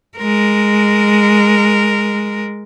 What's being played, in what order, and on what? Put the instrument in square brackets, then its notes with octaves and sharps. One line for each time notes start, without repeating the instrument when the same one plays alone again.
[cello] G#3 A#4